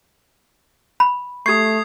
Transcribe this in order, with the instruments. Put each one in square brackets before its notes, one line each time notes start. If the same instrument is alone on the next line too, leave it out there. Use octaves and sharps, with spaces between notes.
[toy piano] B5
[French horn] A3 [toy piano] G4 C#6 [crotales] D#6 G#6 C7